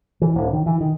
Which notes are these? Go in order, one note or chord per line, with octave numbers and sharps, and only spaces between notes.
E3
D1
D#3
E3
D#3